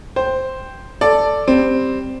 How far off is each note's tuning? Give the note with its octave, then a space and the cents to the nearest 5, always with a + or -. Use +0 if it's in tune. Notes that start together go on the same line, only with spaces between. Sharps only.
C5 +0 G5 +0
A4 +5 D5 +0
G3 +0 C4 +0